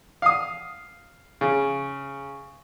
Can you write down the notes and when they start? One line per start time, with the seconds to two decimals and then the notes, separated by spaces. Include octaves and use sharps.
0.22 F5 D#6
1.41 C#3